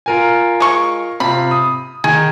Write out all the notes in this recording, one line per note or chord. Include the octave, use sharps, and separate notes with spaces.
F4 A#4 G#5
G#3 C#6
C3 F4 B5
D#6
D#3 G#4